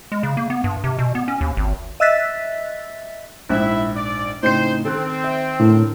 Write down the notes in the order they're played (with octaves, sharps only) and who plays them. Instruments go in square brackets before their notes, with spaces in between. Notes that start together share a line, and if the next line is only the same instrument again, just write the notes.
[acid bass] G#3
C#3
A#3
B3
G2
C3
B2
B3
C#4
D#2
G#1
[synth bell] D#5 E5 E6 F#6 A6 B6
[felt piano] A#1 G#2 [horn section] E4 E5 [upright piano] F#6
[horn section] D5
[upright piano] A2 C#3 C4 [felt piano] D#4 G5 C7 [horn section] C5
[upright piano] D#3 F#6 [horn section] C4 [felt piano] A4
[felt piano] E5
[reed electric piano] A2 [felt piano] D3 [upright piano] A#4 A5